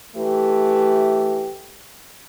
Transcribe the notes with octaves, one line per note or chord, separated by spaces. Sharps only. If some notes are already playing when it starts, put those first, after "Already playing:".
E3 A3 G4